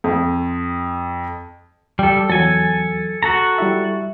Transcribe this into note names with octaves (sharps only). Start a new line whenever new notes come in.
F2
G3 A4 G5
E2 F#3 A4 G#5
F#4 A4 A#5
G3 E4 E5